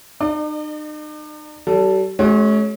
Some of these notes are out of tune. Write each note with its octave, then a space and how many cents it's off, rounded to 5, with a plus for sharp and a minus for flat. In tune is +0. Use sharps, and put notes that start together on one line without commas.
D#4 -40 D5 +40
G3 -45 A4 +0
G#3 +45 C#4 +0 F#4 +40